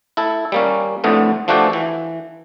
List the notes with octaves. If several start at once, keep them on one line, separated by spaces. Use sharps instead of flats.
E4 A4
G3 A#3 C#4
F2 A2 D3 A3 B3
F3 A3 D4 F#4 G4 A4
E3